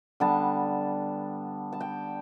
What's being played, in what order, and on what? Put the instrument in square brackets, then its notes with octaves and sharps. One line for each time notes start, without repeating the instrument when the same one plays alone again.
[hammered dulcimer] D3 G3 B3 A5
A5
G5